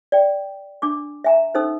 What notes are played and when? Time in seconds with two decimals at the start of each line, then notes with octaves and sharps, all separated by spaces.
0.12 D5 G5
0.82 D4 G#5 D6
1.24 E5 G#5 A#5
1.54 C#4 D#4 A4 C5 E6